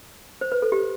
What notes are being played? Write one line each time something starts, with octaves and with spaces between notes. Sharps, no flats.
C5
B4
A4
G4